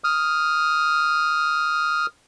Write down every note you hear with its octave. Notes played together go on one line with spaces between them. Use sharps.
D#6 F6